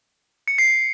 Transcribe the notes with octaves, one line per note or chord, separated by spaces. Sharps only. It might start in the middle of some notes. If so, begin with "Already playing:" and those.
C#7
C7
C#7